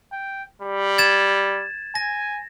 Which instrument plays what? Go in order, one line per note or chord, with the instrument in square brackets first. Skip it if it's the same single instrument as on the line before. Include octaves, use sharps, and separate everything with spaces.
[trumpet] G5
G3
[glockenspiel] G#6 A6 E7
[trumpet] G#5 [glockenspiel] A#6